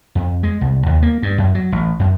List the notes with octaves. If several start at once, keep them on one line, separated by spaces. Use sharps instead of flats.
F2
G#3
C2
D#2
A#3
G2
F#2
F#3
A1
F#2